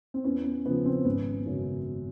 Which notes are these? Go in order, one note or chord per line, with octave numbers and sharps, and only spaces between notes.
C4
E2 B3 C#4
B3
C#3 F3 B3
C4
G#1 B3 C#4
F#2 C#3